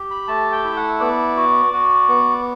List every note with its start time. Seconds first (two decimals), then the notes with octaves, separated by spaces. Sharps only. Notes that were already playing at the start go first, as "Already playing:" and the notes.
Already playing: G4
0.11 B5
0.28 A3 A5
0.52 G5
0.65 E4
0.77 F#5
1.00 B3 D5
1.37 F#4
1.73 F#4
2.09 B3